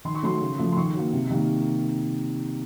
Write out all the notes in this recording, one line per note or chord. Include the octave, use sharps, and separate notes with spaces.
D#3 C6
C#6
F#3 A3 C6
C#3
F3 A3
C6
D#3 C#6
F#3 A#3
C3
D#3 G3 A#3